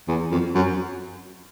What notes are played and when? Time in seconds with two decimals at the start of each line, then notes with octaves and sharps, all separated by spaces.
0.08 E2
0.31 F2
0.55 F#2